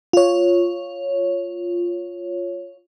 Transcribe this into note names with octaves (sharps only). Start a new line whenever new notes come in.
F4 C#5